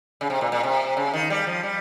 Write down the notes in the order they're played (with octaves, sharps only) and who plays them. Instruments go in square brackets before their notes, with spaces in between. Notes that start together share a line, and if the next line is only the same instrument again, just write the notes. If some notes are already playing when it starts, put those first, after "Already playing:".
[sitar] C#3
C3
A#2
A#2
C3
C#3
D#3
G3
F3
G3